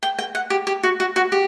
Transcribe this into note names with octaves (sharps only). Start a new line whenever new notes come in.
G5
G5
F#5
G4
G4
F#4
F#4
F#4
G4